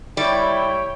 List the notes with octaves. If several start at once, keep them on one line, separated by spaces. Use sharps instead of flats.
G3 E4 C#5 D5 G5